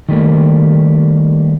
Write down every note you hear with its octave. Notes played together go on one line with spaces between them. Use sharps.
D#3 G3 A3 A#3